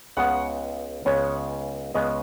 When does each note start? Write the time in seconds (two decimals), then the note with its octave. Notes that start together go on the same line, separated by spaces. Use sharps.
0.17 C#2 C#3 G#3 B3 F#5
1.05 C#2 C#3 G#3 B3 C#5
1.94 C#2 C#3 G#3 B3 D#5